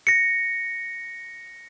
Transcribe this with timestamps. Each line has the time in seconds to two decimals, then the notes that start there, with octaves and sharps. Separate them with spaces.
0.07 A#6 C#7